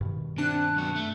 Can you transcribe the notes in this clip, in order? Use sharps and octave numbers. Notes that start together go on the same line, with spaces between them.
G2 B2 D#3
C3 D4 A5 F#6
B1 F#4
A3